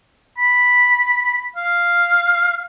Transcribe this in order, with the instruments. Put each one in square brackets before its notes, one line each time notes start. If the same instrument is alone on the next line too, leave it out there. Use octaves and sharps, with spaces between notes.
[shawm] B5
F5